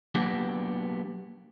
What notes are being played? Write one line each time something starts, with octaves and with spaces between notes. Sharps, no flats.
F#3 A#3 B3 D4 G4